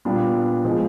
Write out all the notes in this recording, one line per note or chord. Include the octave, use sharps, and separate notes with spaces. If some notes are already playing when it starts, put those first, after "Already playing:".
A#2 G3 B3 D4
F3 G#3